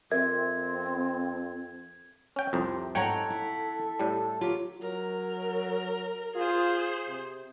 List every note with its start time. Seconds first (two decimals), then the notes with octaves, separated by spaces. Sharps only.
0.12 F2 C4 A#4 E5 G#6
2.36 C#4 G5
2.53 C2 F2 C3
2.95 G#2 A4 C#5 F#5 G5 A#5
3.30 E4
4.00 A2 G3
4.41 F#3 F4 G4
4.82 F#3 A#4
6.36 F4 G#4 C5
7.08 C3